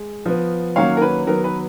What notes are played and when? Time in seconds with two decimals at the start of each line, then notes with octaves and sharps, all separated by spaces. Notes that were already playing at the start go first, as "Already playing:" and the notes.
Already playing: G#3
0.26 F3 B3
0.76 D#3 F#3 A#3 C#4 C#5 F5
0.97 A#4
1.02 B4
1.27 D#3 F#3 B3 A#4
1.44 B4